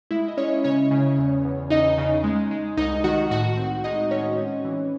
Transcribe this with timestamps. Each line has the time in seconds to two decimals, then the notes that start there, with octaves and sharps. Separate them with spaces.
0.11 G#3 E4 E5
0.28 D#5
0.37 G#3 C#4 C#5
0.64 C#3 C#4 C#5
0.91 C#3
1.18 E2
1.45 E2
1.70 E2 D#4 D#5
1.98 C#3
2.24 G#3
2.51 G#3
2.77 C2 D#4 D#5
3.04 D#3 F#4 F#5
3.31 A2 F#4 F#5
3.57 C4
3.84 G#3 D#4 D#5
4.11 C4 C#4 C#5
4.37 C4
4.65 E3